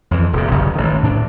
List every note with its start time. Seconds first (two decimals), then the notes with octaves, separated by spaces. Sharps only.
0.11 F2 E3
0.33 D#1 C3
0.51 G1 F#2 C#3 E3
0.75 A1 D#3
1.03 A2 D4